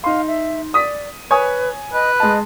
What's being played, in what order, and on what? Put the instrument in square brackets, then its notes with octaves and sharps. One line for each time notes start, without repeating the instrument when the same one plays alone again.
[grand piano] D#4 C6 [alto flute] F5
[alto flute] E5
[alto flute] D5 [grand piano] D#6 B6
[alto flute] B4 [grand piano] C#5 G#5 D#6
[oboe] B4 [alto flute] D#5
[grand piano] G#3 A5 [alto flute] D#5